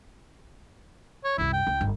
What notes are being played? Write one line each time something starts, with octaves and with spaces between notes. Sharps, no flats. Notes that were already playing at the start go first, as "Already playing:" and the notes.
C#5
C2 F#2 E4
G5
C#2
G1